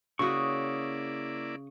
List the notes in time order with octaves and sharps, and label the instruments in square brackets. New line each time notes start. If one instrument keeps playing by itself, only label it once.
[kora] C#3 F#4 [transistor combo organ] A#3 E4 D5 [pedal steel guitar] C#6 D#6